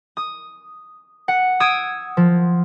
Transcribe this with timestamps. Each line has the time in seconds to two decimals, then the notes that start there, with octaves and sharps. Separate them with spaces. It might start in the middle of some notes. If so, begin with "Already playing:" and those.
0.17 D#6
1.28 F#5
1.60 D#6 E6 G#6 D7 D#7
2.17 F3